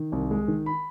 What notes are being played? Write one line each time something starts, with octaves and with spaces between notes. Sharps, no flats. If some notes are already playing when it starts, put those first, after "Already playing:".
Already playing: D#3
C2
G#3
D#3
B5